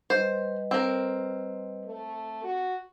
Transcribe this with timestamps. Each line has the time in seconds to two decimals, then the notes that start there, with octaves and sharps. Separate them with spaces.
0.10 G3 B4 C5 D#5
0.71 C4 A#4
1.86 A3
2.44 F#4